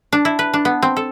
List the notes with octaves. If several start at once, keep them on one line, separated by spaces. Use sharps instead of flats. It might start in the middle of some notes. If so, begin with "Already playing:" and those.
D4
E4
B4
D4
B3
C4
A4